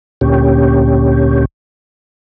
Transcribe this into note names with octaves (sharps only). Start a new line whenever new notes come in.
D2 A#2 C#4 G4